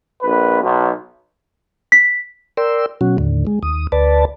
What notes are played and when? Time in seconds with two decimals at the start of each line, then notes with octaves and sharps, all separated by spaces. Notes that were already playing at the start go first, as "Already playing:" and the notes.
0.22 A#1 B4
0.61 B1
1.92 B6
2.57 A#4 D5 G5 C6 E6
3.01 B2 F#3 C#4 F#4
3.18 D#2 A2 D3
3.47 G#3
3.63 D#2 D#6
3.92 D2 B4 D5 A5